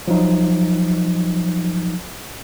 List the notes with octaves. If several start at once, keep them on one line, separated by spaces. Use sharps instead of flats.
F3 F#3 D#4